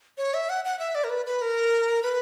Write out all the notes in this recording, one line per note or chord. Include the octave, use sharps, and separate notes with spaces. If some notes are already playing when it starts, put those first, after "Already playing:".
C#5
E5
F#5
F#5
E5
D5
A#4
B4
B4
A#4
B4